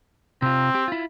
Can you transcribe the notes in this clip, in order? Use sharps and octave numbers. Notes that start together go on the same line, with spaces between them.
C3 C4 F4
G4
E4 F4